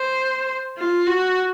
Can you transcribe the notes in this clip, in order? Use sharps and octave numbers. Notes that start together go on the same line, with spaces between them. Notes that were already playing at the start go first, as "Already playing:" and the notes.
Already playing: C5
F4
F#4